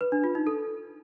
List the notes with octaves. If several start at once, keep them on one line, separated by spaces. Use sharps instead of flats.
B4
D4
F4
D#4
A4